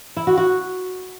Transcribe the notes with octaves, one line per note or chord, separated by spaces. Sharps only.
E4
F#4
F#4